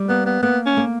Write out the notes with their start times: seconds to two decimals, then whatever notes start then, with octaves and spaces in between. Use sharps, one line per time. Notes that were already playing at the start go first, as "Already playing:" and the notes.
Already playing: G3
0.09 A#3 B3
0.26 B3
0.42 A#3 B3
0.66 C#4
0.77 A#3